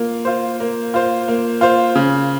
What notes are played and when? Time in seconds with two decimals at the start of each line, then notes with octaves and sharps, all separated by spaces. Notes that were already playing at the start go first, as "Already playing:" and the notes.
Already playing: A#3 F4
0.25 F4 C5
0.60 A#3
0.94 F4 C5
1.28 A#3
1.61 F4 C5
1.95 C#3